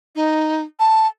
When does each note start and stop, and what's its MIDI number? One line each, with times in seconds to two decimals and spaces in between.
0.16 0.63 63
0.80 1.07 81